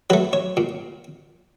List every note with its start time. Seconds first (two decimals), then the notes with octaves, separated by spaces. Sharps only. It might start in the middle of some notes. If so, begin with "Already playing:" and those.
0.10 F#3 B4
0.13 A3
0.33 C#5
0.57 A#2